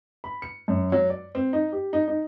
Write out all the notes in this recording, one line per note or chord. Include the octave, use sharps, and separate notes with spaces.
B5
C#7
F#2
F#3
D5
C4
D#4
G4
D#4
D#4